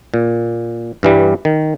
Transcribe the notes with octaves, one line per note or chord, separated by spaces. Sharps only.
A#2
G2 E3 G3
D#3